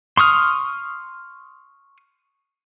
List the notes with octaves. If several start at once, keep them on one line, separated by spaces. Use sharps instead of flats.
C6 C#6 D#6 F6